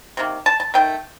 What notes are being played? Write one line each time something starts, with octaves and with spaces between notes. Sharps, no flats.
C3 D#3 A#3
A5
A5
D#3 A3 G5